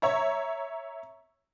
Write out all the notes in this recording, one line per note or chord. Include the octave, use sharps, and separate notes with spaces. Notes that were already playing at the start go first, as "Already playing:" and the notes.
C#5 E5 A#5